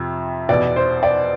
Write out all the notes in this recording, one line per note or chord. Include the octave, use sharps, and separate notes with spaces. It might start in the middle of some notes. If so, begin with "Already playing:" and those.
Already playing: F2 C3
E2 B2 D5
C5
D5